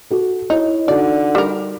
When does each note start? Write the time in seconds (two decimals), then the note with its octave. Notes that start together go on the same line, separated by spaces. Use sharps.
0.10 F#4 A4
0.50 D#4 E4 C#5 D#5
0.88 D3 D#4 F#4 D5
1.35 G3 A#4